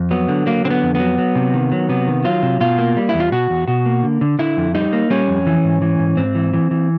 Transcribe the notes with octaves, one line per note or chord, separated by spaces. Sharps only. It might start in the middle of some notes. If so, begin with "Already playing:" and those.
Already playing: F2
F#3 B3
D3
F#3 A#3
D3 C4
B3
F2
F#3 B3
F#3
C3
D#3
F#3
C3 B3
D#3
F#3 F4
C3
B2 F4
A#3
G3
E4
E2
F4
B2 F#4
E2
B2 F#4
A#3
D3
D3
D3 E4
F2
G3 D#4
A#3
G3 C#4
F2
E3
G#2
E3
G#2
G#2 C4
E3
E3
E3